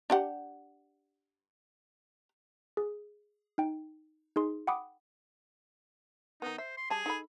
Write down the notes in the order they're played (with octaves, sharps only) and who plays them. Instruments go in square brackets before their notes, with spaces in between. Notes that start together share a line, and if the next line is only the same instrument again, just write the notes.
[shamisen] D4 G4 F#5
[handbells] G#4
D#4 G5
D#4 G#4 C6
F#5 G5 B5 D6 D#6
[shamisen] D#3 B3 [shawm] D#4
[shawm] C5 [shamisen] E5
[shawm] C6
[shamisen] G3 A5 [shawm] G#4
[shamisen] D#4 A4 B5